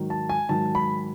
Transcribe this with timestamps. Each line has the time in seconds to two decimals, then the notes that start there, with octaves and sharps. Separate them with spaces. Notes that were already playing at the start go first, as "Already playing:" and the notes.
Already playing: G#2 D#3 F#3
0.10 A5
0.29 G#5
0.49 G#2 D#3 F#3 A5
0.75 B5